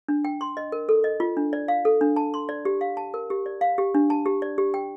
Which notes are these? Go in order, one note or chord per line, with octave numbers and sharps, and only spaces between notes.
D4
G5
C6
D#5
A#4
A4
D#5
F4
D4
D5
F5
A4
D4
A5
C6
D5
G4
F5
A5
A#4
G4
D5
F5
G4
D4
A5
G4
D5
G4
G5